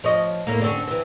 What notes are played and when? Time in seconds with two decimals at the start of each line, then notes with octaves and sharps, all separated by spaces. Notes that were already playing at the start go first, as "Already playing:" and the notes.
0.04 F3 C#5 D#5
0.47 A2 A#3
0.61 D3 C4 C#4
0.88 E3 C4